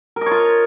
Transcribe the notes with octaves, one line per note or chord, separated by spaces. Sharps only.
A#4
D#5
C#5
F4